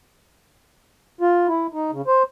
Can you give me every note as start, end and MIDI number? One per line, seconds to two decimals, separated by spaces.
1.21 1.47 65
1.48 1.67 64
1.73 1.91 63
1.91 2.02 49
2.07 2.23 72